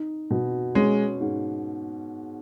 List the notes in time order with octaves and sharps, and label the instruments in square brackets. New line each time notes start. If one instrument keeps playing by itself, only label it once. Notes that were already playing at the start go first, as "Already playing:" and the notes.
Already playing: [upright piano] D#4
B2
[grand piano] G#3 [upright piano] C#4
[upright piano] G#2